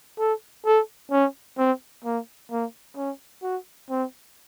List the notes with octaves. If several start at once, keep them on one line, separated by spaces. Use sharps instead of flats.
A4
A4
C#4
C4
A#3
A#3
C#4
F#4
C4